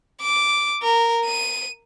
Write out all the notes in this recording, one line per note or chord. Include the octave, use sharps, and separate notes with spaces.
D6
A#4
D#7